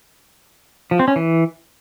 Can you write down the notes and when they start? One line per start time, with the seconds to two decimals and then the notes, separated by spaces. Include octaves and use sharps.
0.91 F3
0.99 C4
1.08 C#4
1.16 E3